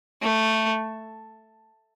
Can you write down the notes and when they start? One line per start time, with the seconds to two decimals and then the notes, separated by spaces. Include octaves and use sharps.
0.22 A3